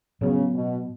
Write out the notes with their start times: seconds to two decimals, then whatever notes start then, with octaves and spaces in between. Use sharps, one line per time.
0.21 A2 C#3 F#3 B3
0.54 B2